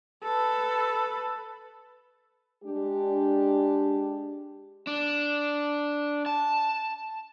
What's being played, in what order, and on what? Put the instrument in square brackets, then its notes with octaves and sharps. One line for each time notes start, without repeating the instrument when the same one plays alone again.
[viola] A4 B4
[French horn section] G#3 D4 G4
[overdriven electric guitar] D4
A5